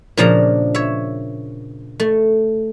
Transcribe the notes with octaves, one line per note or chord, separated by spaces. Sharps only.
A#2 C#3 F3 A#3 D4 A#5
C#5 E5
A3